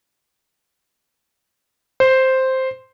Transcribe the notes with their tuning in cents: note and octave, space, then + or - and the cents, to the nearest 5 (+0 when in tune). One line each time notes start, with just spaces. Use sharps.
C5 +0